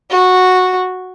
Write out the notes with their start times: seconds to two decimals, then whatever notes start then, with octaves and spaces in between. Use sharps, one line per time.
0.10 F#4